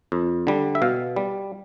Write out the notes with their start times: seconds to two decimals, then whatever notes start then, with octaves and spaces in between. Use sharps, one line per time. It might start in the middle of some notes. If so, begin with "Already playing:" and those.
0.12 F2
0.47 D3 G3
0.75 E5
0.82 B2 F5
1.16 G3